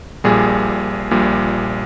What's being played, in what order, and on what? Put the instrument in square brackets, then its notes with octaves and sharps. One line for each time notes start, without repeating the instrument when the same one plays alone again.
[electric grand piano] A#1 A#2 G3 G#4
A#1 A#2 G3